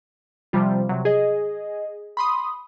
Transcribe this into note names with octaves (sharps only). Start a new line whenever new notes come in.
C3 F3 G3 F4
C3 F#3
G#4 D#5
B5 C6 D#6